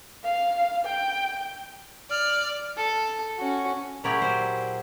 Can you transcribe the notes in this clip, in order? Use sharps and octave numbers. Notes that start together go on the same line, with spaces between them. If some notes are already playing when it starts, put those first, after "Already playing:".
F5
G5
D5 F6
A4
C#4 F#4
A#2 F#3 E4 G4 G#4 D5
C5